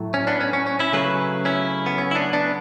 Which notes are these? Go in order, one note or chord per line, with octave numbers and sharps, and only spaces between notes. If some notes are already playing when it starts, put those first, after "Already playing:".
Already playing: A2 F#3 A3
C#4
B3 D4
C#4
C#4
C#4
C#4 E4
C#3 F#3 A3 G#4 B4
C#4 E4
B3
C#4
E4
B3 D4
B3 D4